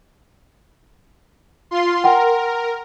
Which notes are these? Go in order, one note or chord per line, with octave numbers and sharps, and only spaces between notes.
F4 C6
A#4 F#5 G5 C6